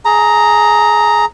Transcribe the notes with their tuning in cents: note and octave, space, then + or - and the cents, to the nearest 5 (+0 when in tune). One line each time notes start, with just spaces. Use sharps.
G#4 +20 A#5 +0